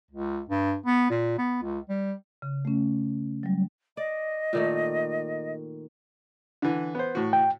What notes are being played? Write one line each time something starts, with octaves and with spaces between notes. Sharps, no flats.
C#2
G2
B3
A#2
B3
C#2
G3
C#3
A3 C#4
F#3 G3
D5 D#5
A#2 D#3 A3
D3 E3
B3 C5
A2 F#4
G5